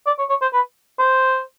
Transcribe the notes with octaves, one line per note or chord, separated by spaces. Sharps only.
D5
C#5
C#5
C5
B4
C5